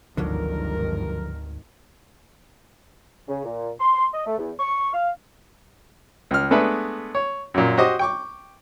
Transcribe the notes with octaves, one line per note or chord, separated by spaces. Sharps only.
G#1 D2 G2 D3 D#3 F3 F#3 A#4
C#3
A#2
C6
D#5
A3
E2
C#6
F5
C#2 F6
G#3 A3 B3 D4 B4
C#5
F#2 A#2
F#4 G4 C5 D#5 D6
G5 C#6 D6